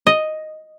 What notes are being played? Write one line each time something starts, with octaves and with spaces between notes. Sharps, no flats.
D#5